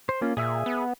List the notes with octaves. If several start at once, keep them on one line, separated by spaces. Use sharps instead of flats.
C5
A#3 C#4 F4
A#2 G#4 E5 E6
B3